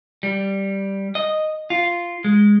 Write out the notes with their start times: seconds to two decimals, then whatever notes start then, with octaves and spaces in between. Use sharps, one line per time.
0.23 G3
1.15 D#5
1.70 F4
2.24 G#3